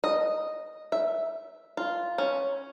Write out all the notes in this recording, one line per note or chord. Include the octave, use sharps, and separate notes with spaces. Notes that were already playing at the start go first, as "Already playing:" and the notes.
D#5
E5
F4
C#4